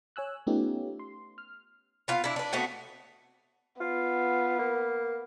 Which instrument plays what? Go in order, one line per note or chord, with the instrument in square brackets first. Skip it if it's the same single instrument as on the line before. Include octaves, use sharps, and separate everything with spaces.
[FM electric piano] C#5 G#5 E6 F#6
A3 B3 C#4 D#4 F4 G4
C6
F6
[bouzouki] B3 F4 F5
D4 E4
D4 B4
A3 B3 C4 F#4
[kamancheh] B3 [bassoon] F4
[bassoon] A#3